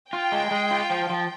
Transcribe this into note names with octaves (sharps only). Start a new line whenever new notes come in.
F4 G5
G#3
G#3
F4
F3
F3